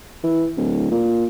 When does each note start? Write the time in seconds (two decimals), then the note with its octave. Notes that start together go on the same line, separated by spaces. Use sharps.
0.24 E3
0.57 D1
0.91 A#2